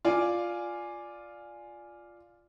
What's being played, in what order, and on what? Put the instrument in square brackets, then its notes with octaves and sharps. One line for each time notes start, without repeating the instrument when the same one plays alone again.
[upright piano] F4 D5 G#5